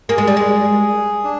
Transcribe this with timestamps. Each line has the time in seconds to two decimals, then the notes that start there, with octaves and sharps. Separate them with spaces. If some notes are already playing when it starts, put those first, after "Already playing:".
0.09 A#3 G#4
0.18 G#3
0.27 G3
0.37 G#3
1.24 D4